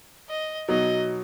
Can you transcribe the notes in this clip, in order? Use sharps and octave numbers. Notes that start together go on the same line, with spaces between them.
D#5
B2 F#3 D#4 D#5